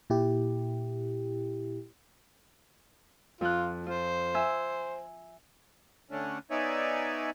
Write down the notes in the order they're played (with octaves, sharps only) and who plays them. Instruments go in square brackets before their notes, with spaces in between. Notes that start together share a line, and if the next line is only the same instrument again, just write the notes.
[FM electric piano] A#2 E4 G4
[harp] F2 F#6 [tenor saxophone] F4
[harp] F4 [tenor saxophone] C5
[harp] E5 G#5 E6
[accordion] D3 A3 C#4 D4
B3 D#4 C#5 D5 E5 G#5